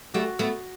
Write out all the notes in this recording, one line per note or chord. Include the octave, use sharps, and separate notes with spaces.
G3 A3 F#4
A3 B3